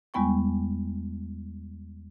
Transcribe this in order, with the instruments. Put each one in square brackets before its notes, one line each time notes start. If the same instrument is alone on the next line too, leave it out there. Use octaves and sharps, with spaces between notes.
[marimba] E2 G3 G#3 B3 G5 C#6